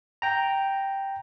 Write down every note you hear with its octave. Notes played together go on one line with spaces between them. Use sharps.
G5 A#5